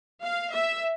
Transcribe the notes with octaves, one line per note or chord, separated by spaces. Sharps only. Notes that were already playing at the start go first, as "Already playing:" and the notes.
F5
E5